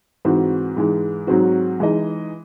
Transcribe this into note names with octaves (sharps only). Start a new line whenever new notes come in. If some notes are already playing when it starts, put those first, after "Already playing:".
G#2 E3 C4 F#4
G#2 E3 G#3
G#2 F#3 C4 F#4
E3 G#3 D#4 G#4 D#5